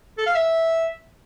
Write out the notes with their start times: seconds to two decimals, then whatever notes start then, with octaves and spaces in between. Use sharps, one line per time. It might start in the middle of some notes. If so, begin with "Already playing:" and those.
0.18 A4
0.26 F5
0.35 E5